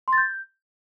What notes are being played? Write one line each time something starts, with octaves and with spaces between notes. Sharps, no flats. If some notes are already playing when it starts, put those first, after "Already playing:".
C6
A6
G6